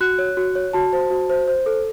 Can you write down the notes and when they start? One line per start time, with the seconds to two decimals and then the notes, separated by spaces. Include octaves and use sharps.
0.01 F#4 F#6
0.19 C#5
0.37 F#4
0.55 C#5
0.73 F#4 A5
0.93 C5
1.10 F#4
1.30 C5
1.48 C5
1.66 A4